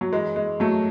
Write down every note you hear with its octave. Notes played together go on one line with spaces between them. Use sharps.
F#3
F#2 E3 G#3
G#3
F#3 A3